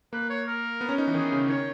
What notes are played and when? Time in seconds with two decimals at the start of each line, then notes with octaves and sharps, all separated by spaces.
0.13 A#3 B4
0.30 C#5
0.47 A#4
0.81 B3
0.89 C#4
0.98 D#4
1.08 E3
1.14 D#3 G#4
1.32 C#3
1.48 D#3 C#5